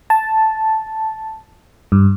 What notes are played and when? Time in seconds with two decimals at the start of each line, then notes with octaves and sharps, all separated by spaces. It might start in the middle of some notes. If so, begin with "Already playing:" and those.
0.10 A5
1.92 G2